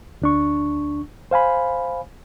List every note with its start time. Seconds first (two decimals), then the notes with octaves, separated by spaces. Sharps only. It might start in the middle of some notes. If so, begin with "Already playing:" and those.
0.22 D2 D4 C#6
1.31 C5 F5 G#5 B5